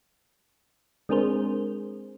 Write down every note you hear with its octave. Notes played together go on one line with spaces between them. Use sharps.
G#3 C4 D4 G#4 A#4 C5